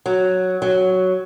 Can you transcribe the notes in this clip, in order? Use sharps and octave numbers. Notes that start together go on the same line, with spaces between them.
F#3
F#3